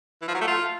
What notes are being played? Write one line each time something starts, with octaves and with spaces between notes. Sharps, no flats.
E3
F3
F#3
A3
F4